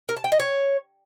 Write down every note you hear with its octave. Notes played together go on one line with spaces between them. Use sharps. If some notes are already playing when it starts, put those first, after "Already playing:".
A#4
A5
G5
D#5
C#5